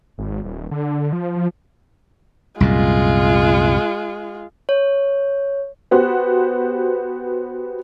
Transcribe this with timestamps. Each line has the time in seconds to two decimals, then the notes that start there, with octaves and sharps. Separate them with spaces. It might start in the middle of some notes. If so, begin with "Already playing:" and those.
0.18 G#1
0.44 D#1
0.71 D3
1.12 F3
1.36 F3
2.60 C2 F#2 A#2 G#3 F4
4.69 C#5
5.91 B3 F#4 G4 C5